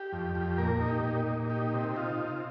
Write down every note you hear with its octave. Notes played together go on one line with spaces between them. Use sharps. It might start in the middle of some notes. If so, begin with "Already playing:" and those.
Already playing: G4
F2
F2
A#2 A#4
D#4
G4
A#2
A#2
D#4 G4
C3
G4
D#4 F4
C3